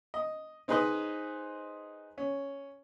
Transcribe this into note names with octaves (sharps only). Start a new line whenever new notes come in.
D#5
C4 D#4 G#4 B4 C5 D#5
C#4